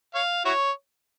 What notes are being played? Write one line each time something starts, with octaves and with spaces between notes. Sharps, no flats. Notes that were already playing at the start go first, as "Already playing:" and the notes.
C#5 F5
E4 F#4 C#5